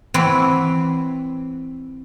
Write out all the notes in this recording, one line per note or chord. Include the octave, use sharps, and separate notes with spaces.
E3 C4 B4 C#5